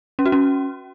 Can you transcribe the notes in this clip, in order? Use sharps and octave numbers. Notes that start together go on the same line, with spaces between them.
C#4
F#4
C#4